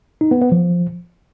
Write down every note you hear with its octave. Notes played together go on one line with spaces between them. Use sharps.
D#4
B3
B3
F3